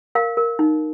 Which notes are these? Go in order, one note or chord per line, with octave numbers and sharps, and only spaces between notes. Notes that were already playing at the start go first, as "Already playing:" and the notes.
A#4 F5
A#4
D#4